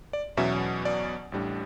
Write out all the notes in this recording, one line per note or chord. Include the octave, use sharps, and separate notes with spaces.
D5
E2 B2 F#3 C#4 E5
D5
A1 A2 G3 D4